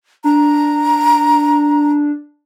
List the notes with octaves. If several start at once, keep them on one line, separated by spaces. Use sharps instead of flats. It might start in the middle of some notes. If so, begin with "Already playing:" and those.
D4 A#5